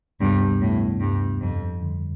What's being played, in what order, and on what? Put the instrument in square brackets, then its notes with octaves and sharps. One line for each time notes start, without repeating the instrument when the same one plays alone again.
[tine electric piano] D2 C3 G3 B3 [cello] G2
[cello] A2
G2
F2
[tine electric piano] F2 D3 G3